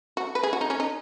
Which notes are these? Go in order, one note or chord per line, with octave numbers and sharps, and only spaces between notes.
F#4
B4
G#4
F#4
D#4
C#4
D#4